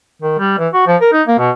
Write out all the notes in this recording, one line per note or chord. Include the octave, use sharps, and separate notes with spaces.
D#3
G3
E3
F#4
F3
A#4
D#4
A#3
B2